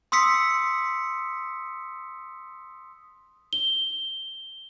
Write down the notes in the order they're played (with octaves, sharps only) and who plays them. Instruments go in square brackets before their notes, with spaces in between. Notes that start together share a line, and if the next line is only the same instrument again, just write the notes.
[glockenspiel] C6 D#6 E6 B6 C#7
G7